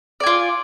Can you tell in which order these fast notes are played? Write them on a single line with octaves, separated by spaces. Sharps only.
D5 G#5 F4